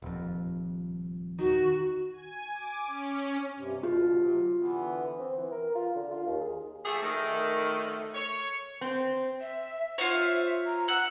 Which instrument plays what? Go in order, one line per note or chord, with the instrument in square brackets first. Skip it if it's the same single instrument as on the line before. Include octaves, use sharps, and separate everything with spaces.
[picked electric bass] D#1 F2
[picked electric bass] D#3 [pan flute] F#4
[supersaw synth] G#5
D6
C#4
[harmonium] G2 C3
[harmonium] D2 B2 [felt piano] F4
[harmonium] C3 F#3
D3 E3 B3
[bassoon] C4
E3
A#4
F4
D3
F4
D#2
G#4
[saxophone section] F3 A3 [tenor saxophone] G#4
[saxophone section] D#3 [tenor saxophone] A3
[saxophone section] C#5
[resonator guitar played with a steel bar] C4
[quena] E5
[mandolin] F4 C5 C#5 [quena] F#5
[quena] E5
A#5
[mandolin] F#5 [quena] E6